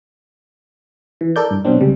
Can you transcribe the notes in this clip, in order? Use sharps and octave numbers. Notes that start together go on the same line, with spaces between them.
E3
A4 A#4 D5 G6
G2
B2 F#3 C4 D4
C#2 C3 G3